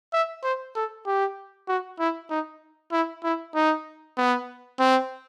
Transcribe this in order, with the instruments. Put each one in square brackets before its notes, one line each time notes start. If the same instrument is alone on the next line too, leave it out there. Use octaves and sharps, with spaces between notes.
[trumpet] E5
C5
A4
G4
F#4
E4
D#4
E4
E4
D#4
B3
C4